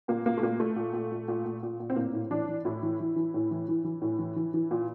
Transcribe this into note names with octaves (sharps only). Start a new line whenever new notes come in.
A#2 A#3
A#2 A#3
A3
A#2 A#3
A#2 A3
A#2
A#2
A#2
A#2
A#2
A#2
A#2
C4
A2 A#3
A2
E3 D4
E3
A2 E4
E3
E3
E3
A2
E3
E3
E3
A2
E3
E3
E3
A#2